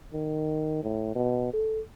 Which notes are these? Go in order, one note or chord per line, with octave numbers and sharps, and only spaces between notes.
D#3
A2
B2
A4